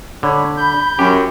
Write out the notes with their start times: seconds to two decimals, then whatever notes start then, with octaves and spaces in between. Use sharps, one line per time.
0.23 D3 C#5 B5
0.57 G6
0.99 F#2 G4